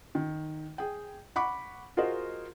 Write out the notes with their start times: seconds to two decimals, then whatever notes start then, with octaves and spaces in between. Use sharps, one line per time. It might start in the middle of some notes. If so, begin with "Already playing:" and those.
0.15 D#3
0.78 G#4 G5
1.36 F#5 B5 C#6 D6
1.97 F4 F#4 G#4 A#4 C5 D#5